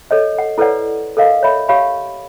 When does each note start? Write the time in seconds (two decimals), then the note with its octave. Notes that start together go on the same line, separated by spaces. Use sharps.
0.11 A4 C#5 D#5
0.38 F#5
0.58 E4 A4 B4 C#5 D5 F#5
1.17 A4 A#4 D#5 F5
1.43 C#5 E5 B5
1.68 G4 C#5 F5 B5